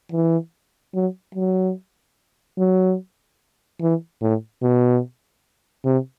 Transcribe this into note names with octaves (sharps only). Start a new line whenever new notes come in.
E3
F#3
F#3
F#3
E3
A2
B2
C3